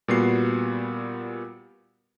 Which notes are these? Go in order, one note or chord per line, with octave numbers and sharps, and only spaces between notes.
A#2 G3 B3 F#4 C7